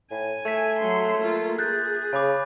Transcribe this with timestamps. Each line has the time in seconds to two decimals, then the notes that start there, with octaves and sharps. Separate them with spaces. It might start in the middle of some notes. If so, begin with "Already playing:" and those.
0.11 A2 G#5
0.45 A3 G#6 B6
0.79 F#3 C6
1.18 A#3 F4
1.59 G#4 F#6 G6 A6
2.13 C#3 G#5 B5 D6